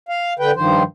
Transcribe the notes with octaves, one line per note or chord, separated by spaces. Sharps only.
F5
D3 B4 G5
G2 D#3 F3 C5